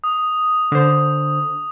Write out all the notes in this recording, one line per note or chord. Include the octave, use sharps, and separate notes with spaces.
D#6
D3 C5